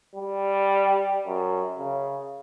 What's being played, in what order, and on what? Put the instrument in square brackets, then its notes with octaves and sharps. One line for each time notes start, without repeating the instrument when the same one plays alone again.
[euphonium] G3
F#2
C#3